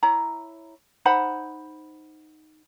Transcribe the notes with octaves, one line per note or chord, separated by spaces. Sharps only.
E4 C#5 A#5
D#4 C5 F#5 B5